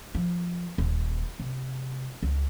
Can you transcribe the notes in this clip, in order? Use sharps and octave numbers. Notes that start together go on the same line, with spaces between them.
F3
D#1
C3
C#2